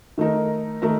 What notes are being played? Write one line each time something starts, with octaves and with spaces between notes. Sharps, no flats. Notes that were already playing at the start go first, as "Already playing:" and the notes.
D#3 A3 D#4 A#4
D#3 A3 D#4 A#4